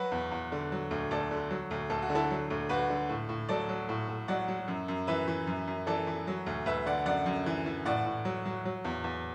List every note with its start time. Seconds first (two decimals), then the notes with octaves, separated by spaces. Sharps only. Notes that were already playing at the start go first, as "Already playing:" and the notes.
Already playing: F#3 F#4 B4
0.11 E2
0.31 E2
0.52 D3
0.72 F#3
0.91 D2
1.11 D2 A4 D5
1.31 D3
1.50 F#3
1.71 D2
1.90 D2 A4
2.02 F#4
2.10 D3
2.15 E4 A4
2.30 F#3
2.50 D2
2.69 D2 F#4 B4
2.90 D3
3.09 A2
3.29 A2
3.49 F#3 A4 D5
3.69 F#3
3.89 A2
4.09 A2
4.28 F#3 D5 F#5
4.48 F#3
4.68 F#2
4.88 F#2
5.07 E3 B4 E5
5.28 E3
5.47 F#2
5.67 F#2
5.87 E3 A4 D5
6.07 E3
6.27 F#3
6.46 D2
6.66 D2 B4 E5
6.86 D3 D5 F#5
7.06 F#2 D5 F#5
7.26 F#2
7.46 E3
7.66 E3
7.85 A2 D5 F#5
8.06 A2
8.25 F#3
8.45 F#3
8.65 F#3
8.84 E2
9.04 E2